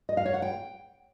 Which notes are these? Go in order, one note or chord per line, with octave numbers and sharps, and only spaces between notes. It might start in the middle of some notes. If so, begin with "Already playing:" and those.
D#5
F5
C#5
F#5
G5